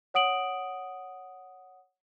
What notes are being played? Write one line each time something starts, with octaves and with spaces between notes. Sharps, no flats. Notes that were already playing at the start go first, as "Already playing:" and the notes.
C#5 F#5 D#6 D7 F#7